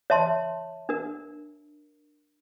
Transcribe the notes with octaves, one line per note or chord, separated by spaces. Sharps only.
C#5 E5 A5 C6
D4 A#4